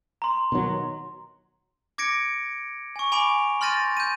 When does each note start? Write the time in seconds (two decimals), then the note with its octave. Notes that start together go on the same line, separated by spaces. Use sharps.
0.22 A#5 C6
0.52 B2 D#3 F#3
1.98 D6 G#6 A#6 C#7 D7
2.96 G#5 C#6
3.12 G#5 B5 C#6 D6 D7 F7
3.61 C6 F6 G6 A6 A#6 D#7
3.97 G6 D#7